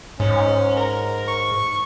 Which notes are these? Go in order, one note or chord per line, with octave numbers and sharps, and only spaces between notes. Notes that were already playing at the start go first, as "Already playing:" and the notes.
G#2 C#4
A#4
C#6